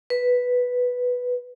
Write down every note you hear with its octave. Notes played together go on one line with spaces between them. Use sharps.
B4